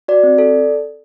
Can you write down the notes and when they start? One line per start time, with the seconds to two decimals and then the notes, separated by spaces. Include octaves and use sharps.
0.08 F#4 D5
0.23 C4
0.38 A4